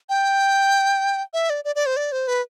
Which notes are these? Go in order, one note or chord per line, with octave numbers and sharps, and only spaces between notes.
G5
E5
D5
D5
D5
C5
D5
C5
B4